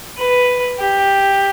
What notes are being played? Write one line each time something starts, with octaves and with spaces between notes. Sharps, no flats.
B4
G4